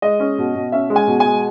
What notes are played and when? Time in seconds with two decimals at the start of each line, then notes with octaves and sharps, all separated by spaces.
0.02 G#3 D#5
0.20 C#4
0.38 B2
0.55 B2
0.72 C#4 E5
0.90 G#3
0.96 G#5
1.07 B2
1.20 G#5
1.26 G#3